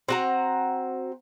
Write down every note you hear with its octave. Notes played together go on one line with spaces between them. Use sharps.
C4 F#4 A#5